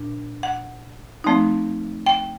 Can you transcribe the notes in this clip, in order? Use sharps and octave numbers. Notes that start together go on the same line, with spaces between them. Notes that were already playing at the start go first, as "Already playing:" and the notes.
Already playing: A#2 D4
F#5
F3 A3 C4 D#4
G5